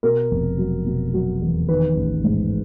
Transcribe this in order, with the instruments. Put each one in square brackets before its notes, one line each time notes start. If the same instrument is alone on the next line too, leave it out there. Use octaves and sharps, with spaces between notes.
[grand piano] B2 A#4
F1
F#3
B2
F#3
E2
D#3 B4
A1
G#2